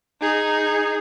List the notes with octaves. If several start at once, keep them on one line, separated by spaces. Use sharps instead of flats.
D#4 G#4